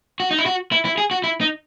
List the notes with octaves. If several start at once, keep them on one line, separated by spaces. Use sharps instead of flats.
F#4
D#4
E4
F#4
E4
E4
G#4
F#4
E4
D#4